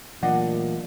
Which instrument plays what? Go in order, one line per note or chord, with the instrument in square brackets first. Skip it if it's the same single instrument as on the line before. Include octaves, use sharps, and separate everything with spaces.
[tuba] A#2 [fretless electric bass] E3 F#3 A3 [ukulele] D4 D#5 F#5